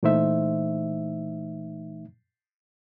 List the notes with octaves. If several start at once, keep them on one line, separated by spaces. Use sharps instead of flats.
A#2 E3 A3 D#4 C5 E5